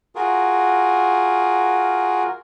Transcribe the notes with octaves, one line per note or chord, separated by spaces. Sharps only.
F4 F#4 G#4 A#4